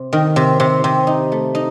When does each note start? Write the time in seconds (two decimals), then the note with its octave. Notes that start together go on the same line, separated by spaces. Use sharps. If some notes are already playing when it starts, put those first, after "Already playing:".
Already playing: C3
0.13 D#3
0.36 C3
0.60 C3
0.84 C3
1.07 D#4
1.32 A3
1.55 D#4